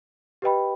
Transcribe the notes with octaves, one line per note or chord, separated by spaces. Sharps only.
G4 B4 D#5 G5 B5